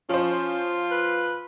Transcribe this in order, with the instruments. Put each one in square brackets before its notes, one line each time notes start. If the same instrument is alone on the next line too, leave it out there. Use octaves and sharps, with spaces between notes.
[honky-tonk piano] F3 C5 [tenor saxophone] C#4 [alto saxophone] F4
[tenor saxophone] B4